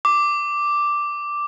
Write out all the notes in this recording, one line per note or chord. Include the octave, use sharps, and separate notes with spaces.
D6